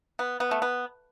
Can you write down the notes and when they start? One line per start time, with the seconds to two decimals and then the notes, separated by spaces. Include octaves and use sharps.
0.19 B3
0.40 B3
0.51 A3
0.62 B3